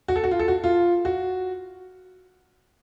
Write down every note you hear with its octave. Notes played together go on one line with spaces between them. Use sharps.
F#4
A4
F#4
F4
A4
F#4
F4
F#4